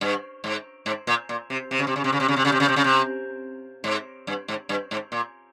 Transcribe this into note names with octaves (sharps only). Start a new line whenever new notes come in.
G2
G#2
G#2
A#2
A#2
C3
C3
C#3
C3
C#3
C3
C#3
C3
C#3
C3
C#3
C3
C#3
C3
C#3
C3
G#2
G2
G#2
G2
G#2
A#2